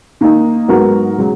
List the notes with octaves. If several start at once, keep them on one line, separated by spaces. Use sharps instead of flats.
D#3 A#3 D#4
G#2 F#3 B3 F#4 A#4
C#3 F#3